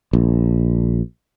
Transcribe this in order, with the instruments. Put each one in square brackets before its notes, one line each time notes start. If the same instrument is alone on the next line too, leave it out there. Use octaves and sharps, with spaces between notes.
[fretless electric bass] A#1